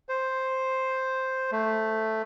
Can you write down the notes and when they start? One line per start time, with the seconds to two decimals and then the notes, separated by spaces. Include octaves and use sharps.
0.09 C5
1.52 A3